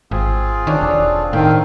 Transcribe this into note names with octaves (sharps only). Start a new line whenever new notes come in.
G#1 C4 F4 G#4
D#3 D4 F#4 C#5
E1 A4 A5
A2 D#3 C4 F5 G5